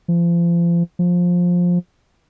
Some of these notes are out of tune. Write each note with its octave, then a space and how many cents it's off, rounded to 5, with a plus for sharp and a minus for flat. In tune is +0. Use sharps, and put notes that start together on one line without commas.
F3 -35
F3 +15